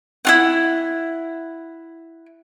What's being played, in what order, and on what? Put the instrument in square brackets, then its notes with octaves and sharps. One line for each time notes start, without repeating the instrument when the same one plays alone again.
[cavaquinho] E4 F4 F#5